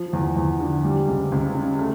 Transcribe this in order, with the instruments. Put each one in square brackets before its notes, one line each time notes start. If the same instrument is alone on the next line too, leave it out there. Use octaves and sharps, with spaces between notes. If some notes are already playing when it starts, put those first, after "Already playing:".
Already playing: [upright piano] F3
E2
E2
D3
G3
C#2
C#2
C#3
A3